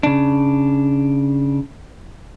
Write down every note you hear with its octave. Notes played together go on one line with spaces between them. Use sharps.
C#3 D4